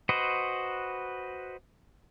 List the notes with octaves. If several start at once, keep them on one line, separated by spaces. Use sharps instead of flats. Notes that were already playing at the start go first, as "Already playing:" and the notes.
F#4 B4 C5 D#5